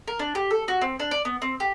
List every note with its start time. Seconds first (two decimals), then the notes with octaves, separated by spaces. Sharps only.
0.08 A#4
0.19 D4
0.35 G4
0.51 A4
0.68 F#4
0.81 C4
1.00 D4
1.11 D5
1.25 B3
1.42 C4
1.60 G4